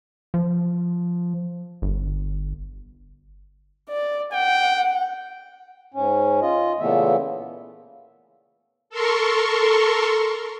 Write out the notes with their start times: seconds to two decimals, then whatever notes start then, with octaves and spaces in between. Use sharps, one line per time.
0.34 F3
1.82 G1
3.89 D5
4.33 F#5 G5
5.93 G#2 C#4
6.42 F4 D#5
6.80 A#2 C#3 E3 A3 B3 E5
8.90 A4 A#4 C6 C#6